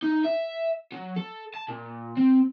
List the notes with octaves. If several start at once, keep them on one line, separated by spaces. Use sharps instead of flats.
D#4
E5
F#3
A4
A5
A#2
C4